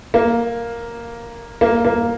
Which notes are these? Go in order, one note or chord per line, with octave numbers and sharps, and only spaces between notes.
A#3
A#3
A#3